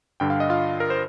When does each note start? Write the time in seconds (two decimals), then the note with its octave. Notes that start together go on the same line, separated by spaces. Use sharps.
0.20 G2 D3 G5
0.30 F5
0.40 D#5
0.50 F4 F5
0.80 A#4
0.90 C5